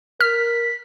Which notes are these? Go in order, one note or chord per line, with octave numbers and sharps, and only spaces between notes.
A#4 F6 B6